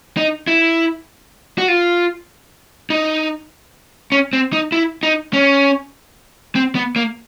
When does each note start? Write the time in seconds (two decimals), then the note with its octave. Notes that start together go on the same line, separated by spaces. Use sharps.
0.17 D#4
0.48 E4
1.58 F#4
1.68 F4
2.90 D#4
4.12 C#4
4.33 C4
4.53 D#4
4.72 E4
5.03 D#4
5.33 C#4
6.55 C4
6.75 B3
6.96 A#3